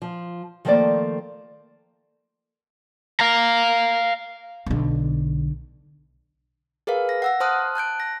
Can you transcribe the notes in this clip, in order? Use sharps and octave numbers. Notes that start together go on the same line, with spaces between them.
F3
D#3 F3 A3 A#3 C5 D5
F5 A#5
B1 D3
G#4 A#4 B4 F5
A#6
F#5 E6 A#6
C5 A5 C6 D#6 F6 F#6
A5 F#6 G6 D7
A#6